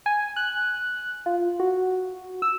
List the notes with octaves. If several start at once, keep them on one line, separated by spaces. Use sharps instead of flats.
G#5
F#6
F4
F#4
E6